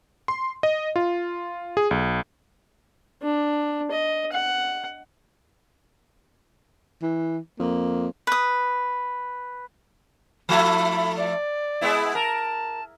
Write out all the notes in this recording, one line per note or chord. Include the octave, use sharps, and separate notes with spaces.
C6
D#5
F4
G#4
B1
D4
D#5
F#5
E3
F2 A#3
B4 D#6
F3 A3 E4 B5
D5
G#3 B3 E4
A#4 A5